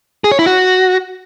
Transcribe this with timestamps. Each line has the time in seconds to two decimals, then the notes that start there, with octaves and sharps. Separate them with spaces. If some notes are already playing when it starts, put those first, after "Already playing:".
0.24 G#4
0.32 C#5
0.39 E4
0.46 F#4